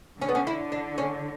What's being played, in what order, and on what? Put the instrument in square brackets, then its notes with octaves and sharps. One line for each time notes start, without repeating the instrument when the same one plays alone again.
[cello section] D3 [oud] C#4
[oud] B3
C#4
E4
D4
C#4